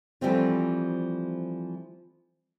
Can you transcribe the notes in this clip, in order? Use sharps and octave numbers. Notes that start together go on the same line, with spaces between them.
E3 F3 G3 A3 C4 F4